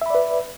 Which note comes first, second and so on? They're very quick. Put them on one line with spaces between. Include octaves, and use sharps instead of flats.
E5 B5 D5 B4